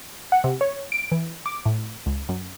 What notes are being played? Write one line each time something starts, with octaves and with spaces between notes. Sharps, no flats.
F#5
C3
C#5
D7
E3
D6
A2
C#2
F#2